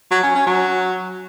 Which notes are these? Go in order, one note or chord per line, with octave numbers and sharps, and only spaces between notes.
F#3
C#4
C#4
F#3